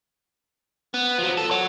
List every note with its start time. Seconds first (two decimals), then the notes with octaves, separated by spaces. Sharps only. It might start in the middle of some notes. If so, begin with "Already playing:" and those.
0.94 B3
1.18 F3 F#3
1.37 A4
1.51 C#5 F#5